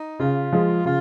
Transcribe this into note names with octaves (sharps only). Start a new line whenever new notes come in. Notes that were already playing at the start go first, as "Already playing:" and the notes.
Already playing: D#4
C#3 F4
F3 G#3
C#3 F4